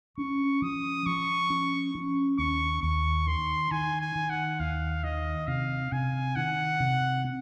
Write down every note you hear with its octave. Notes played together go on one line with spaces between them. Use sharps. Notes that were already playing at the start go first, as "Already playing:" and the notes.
C#4 C#6
F3 D#6
F3 C#6
C#4
C#4
D#2 C#6
D#2 C#6
D#3 C6
D#3 G#5
G#5
D#3
F#5
D#2 F5
D#3 D#5
C3 F5
C3 G#5
D#3 F#5
C3
C4